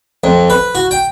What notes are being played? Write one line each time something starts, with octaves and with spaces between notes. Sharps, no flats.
F2
B4
F#4
G5